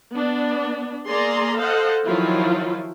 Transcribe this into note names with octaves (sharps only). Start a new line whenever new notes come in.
B3 D4
A#3 G#4 D5 A#5 C6
A4 C5 D#5 F5 F#5
D#3 F3 F#3 E4 F4